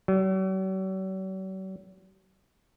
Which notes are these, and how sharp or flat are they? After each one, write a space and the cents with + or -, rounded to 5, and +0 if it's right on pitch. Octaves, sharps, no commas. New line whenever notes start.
F#3 +45